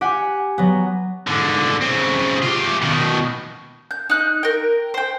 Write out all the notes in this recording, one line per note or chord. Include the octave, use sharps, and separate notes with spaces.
G4 F#5 G#5
F#3 B3
G#2 D3
C#3 C4
F4 G4
B2 D#3
G6
D#4 F#6
A#4 G5
C5 G5